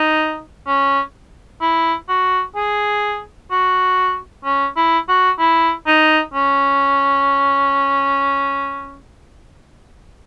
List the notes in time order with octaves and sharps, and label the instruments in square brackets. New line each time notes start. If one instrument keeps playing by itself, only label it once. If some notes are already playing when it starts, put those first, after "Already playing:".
Already playing: [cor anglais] D#4
C#4
E4
F#4
G#4
F#4
C#4
E4
F#4
E4
D#4
C#4